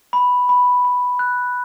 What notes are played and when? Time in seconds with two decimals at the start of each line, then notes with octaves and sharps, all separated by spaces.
0.13 B5
0.49 B5
0.85 B5
1.19 F#6